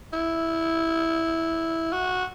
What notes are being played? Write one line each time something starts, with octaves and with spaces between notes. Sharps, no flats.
E4
F#4